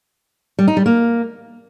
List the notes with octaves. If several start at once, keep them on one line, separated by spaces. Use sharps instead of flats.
G3
D#4
G3
A#3